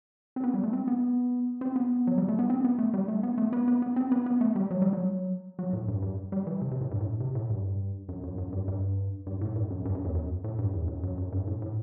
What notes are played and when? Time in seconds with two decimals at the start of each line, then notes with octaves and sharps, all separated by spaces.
0.36 C4
0.44 B3
0.54 G3
0.63 A3
0.73 C4
0.88 B3
1.61 C4
1.76 B3
2.07 F#3
2.18 G3
2.28 A3
2.39 B3
2.50 C4
2.64 B3
2.79 A3
2.93 G3
3.08 A3
3.23 B3
3.38 A3
3.53 B3
3.68 B3
3.82 B3
3.96 C4
4.12 B3
4.26 B3
4.41 A3
4.56 G3
4.71 F#3
4.82 G3
4.93 F#3
5.59 F#3
5.73 A2
5.88 G2
6.02 G2
6.32 G3
6.47 E3
6.61 C3
6.71 C3
6.81 A2
6.91 G2
7.01 A2
7.20 C3
7.35 A2
7.50 G2
8.09 F#2
8.24 F#2
8.38 F#2
8.53 G2
8.68 G2
9.27 G2
9.41 A2
9.56 G2
9.70 F#2
9.85 G2
9.95 F#2
10.05 E2
10.15 F#2
10.44 A2
10.59 G2
10.73 E2
10.88 F#2
11.03 F#2
11.18 F#2
11.32 G2
11.47 A2
11.62 A2